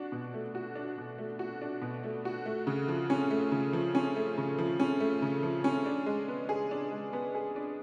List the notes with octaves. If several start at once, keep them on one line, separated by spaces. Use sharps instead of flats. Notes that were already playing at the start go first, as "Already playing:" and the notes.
Already playing: D4 F#4
B2
A3
F#4
D4
B2
A3
F#4
D4
B2
A3
F#4
A3
C#3
F3
C#4
A3
C#3
F3
C#4
A3
C#3
F3
C#4
A3
C#3
F3
C#4
D4
G#3
B3
G#4
D4
G#3
B3
G#4
D4